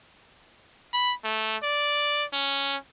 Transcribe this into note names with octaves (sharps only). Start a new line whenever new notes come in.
B5
A3
D5
C#4